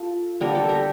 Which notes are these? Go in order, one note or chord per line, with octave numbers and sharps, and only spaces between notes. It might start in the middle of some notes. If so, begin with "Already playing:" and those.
Already playing: F4 A4
D3 G3 A#3 A#4
A4
G4 A#4